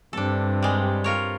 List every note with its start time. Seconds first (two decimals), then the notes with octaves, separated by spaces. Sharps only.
0.13 G2 C3 D4 A4
0.63 G3 G#3
1.04 F4 A#4 C#5